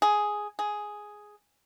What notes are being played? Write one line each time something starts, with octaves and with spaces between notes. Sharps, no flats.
G#4
G#4